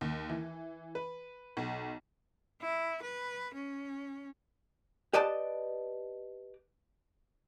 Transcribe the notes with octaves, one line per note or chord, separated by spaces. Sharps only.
D#2
E3
B4
B1
E4
B4
C#4
G4 B4 D5 D#5 A5